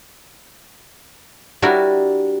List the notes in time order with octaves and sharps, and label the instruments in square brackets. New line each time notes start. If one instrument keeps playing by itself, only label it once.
[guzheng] G3 D4 E4 F#4 A#4